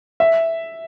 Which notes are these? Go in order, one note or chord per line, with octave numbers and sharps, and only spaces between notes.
E5